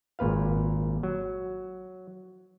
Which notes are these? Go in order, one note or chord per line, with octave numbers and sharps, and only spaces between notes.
G#1 A#2 B4 F5
F#3